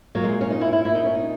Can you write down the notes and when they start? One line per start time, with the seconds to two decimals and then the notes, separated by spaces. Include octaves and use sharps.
0.15 A#2 F#3
0.24 G#3
0.41 C#4
0.50 D#4
0.61 E4
0.73 E4
0.85 A#2 E4
0.95 D#4
1.05 C#4
1.15 D#4